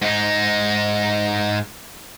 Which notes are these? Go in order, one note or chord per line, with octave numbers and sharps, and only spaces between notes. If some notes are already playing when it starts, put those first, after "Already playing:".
G#2 D#4